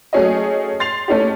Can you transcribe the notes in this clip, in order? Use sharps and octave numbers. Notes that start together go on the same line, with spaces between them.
F#3 A3 C#4 G#4 C#5 D#5
C6 A6 C7 F7
A3 C#4 D#4 G4